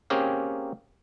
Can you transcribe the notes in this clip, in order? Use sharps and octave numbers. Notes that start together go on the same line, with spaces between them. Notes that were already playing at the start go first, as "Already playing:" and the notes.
A#3 C4 C#4 G4 G#4 A#4